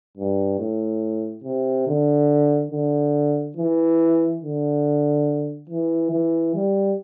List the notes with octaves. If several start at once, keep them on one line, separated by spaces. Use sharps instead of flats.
G2
A2
C3
D3
D3
E3
D3
E3
E3
G3